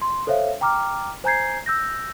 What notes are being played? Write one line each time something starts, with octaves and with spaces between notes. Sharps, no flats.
C6
A4 C5 C#5 E5 F5
G5 A#5 D6 F6
C5 G#5 A#5 G6 G#6 C7
E6 G6 A#6